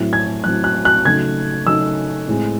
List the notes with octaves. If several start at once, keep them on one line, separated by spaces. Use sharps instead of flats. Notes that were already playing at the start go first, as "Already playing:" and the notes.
Already playing: A2 F#3 C4 E4
G#6
A2 F#3 C4 E4 F#6
F#6
F#6
C#3 F#3 A3 D#4 G#6
C#3 F#3 A3 D#4 E6
A2 G#3 C4